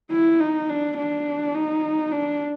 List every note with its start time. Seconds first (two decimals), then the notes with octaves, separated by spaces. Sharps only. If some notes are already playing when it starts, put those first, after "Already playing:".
0.12 E4
0.40 D#4
0.69 D4
0.98 D4
1.54 D#4
2.12 D4